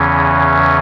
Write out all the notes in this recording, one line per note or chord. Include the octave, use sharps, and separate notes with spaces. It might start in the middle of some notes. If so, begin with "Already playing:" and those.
Already playing: E2 C#3 E3 C#4